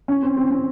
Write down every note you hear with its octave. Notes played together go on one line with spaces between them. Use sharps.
C#4
C4
C4
C4